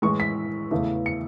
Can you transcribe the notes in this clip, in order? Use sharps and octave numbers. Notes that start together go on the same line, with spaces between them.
A2 E3 G#3 C#6
B6
E2 C#3 E3 A3
C#7